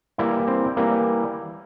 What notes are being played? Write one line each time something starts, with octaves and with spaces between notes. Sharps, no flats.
E3 G3 A#3 E4
C4
E3 G3 A#3